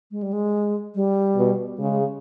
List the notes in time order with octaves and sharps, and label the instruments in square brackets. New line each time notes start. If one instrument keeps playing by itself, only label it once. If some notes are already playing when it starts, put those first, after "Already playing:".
[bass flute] G#3
G3
G#3
G3
[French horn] B2
[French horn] C#3 [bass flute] G#3